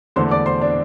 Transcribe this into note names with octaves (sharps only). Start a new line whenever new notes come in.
E2 D3 A3 C5 C6
D5 D6
C5 C6
D4 D5